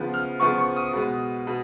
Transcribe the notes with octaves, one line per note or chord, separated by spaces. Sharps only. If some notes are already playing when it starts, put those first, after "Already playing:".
Already playing: C#3 F3 B3
F6
C#3 F3 B3 C#6
C#6
D#6
B2 G#3 B3
B2